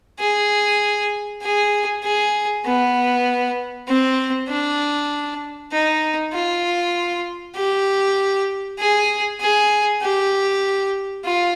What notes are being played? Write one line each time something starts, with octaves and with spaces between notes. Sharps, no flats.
G#4
G#4
G#4
B3
C4
D4
D#4
F4
G4
G#4
G#4
G4
F4